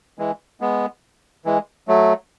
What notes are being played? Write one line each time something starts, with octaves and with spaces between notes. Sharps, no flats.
E3 G#3
G#3 B3
E3 G#3
F#3 A3